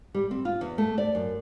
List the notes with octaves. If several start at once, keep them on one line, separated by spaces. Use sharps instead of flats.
G3
C4
F4
E2
A3
D5
F#2